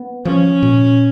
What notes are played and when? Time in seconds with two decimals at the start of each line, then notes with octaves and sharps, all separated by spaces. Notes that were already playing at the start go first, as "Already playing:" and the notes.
Already playing: B3
0.25 F3 C#4
0.62 A#2